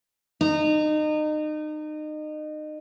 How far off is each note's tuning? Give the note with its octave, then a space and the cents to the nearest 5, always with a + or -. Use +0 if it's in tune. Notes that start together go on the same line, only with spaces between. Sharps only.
D#4 -30